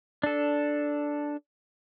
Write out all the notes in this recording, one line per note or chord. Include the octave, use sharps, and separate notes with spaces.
D4 A4